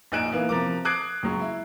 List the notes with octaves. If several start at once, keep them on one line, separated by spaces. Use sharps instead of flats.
A#1 D#4 G#5 F#6 D7 E7
E3 A#3 B3
C3 F3 A#4 D6
D6 D#6 F#6 G#6 C7 D7
C#2 F#3
E4